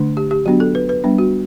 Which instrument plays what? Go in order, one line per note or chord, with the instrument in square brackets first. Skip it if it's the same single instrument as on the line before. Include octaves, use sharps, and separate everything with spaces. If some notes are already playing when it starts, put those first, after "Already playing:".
Already playing: [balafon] D3 A3 D4
G4
G4
F#3 B3 D4 F#4
A4
B4
B4
G3 B3 D4
F#4